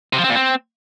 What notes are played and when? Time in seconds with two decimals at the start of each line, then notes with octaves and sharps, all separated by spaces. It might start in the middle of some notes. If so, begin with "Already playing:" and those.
0.13 C3
0.18 F3
0.24 C4
0.29 A#2
0.35 C4